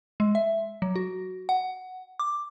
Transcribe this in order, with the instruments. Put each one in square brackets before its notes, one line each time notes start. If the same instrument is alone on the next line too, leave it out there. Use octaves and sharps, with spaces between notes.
[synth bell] G#3
E5
F#3
F#4
F#5
D6